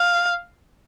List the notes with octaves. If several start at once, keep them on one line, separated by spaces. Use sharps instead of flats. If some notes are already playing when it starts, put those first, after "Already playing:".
Already playing: F5